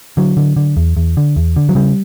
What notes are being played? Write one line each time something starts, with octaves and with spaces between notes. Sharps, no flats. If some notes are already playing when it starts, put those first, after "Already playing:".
D3 F#3
D3
D3
E2
E2
D3
E2
D3
F#3
C#3 G3